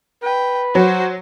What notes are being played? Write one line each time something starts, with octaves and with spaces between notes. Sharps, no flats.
B4 G5
F#3 F#4 C5